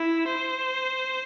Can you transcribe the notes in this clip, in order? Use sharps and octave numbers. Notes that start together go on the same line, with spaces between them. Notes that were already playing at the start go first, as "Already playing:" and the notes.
Already playing: E4
C5